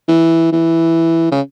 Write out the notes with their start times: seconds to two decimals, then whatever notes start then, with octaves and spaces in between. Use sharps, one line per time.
0.08 E3
0.52 E3
1.31 C#3